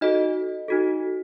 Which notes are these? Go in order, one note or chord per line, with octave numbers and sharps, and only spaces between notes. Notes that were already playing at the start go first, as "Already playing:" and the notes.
D#4 F#4 A4 D#5
D#4 F#4 A4